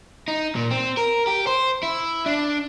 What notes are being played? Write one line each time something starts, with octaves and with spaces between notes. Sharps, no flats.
D#4
A#2
C4
A#4
G4
C5
E4
D4